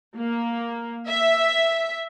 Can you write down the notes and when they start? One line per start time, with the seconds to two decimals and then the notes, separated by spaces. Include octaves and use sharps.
0.17 A#3
1.09 E5